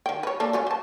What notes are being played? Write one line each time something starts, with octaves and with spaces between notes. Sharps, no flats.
D#3 G5
B4 C#5
A#3 D4 A4
F#3 A3 C#4
C5 A5